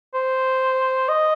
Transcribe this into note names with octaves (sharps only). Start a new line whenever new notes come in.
C5
D#5